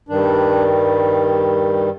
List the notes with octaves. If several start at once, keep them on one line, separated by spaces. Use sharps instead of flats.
G2 D#3 G3 D4